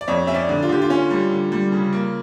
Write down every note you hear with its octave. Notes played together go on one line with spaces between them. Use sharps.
D5
F2 C#5
C#4 E5
D5
D3
F4
D3 G4
F4
C#4
G3
D3
G3
C#3
A#3